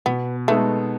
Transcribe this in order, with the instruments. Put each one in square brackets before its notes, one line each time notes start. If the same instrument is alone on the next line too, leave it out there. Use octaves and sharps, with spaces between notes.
[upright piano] B2 [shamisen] B3
[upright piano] G#3 B3 D#4 A4 [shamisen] A3